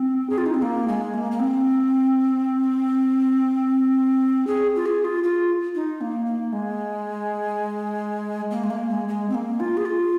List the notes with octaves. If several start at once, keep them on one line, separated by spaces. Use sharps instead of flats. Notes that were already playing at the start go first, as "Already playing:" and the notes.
Already playing: C4
G#4
F4
D#4
C4
A#3
G#3
A#3
A#3
C4
G#4
F4
G#4
F4
F4
D#4
A#3
A#3
G#3
A#3
G#3
A#3
G#3
G#3
C4
A#3
F4
G#4
F4